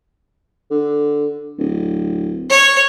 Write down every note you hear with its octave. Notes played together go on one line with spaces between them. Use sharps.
D3
D1
C#5